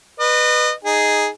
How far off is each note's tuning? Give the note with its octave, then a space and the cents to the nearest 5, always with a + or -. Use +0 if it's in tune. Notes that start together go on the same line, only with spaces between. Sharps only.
B4 +0 D#5 -35
D#4 +0 G#4 +0